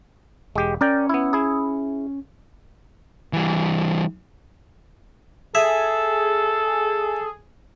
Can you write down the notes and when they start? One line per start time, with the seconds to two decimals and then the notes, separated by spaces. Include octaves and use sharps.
0.55 E1 G#3 G4
0.81 C#4 A#4 D5 G5
1.09 B3 E4
1.33 E4 G#4
3.33 E3 G3
5.55 G#4 A4 E5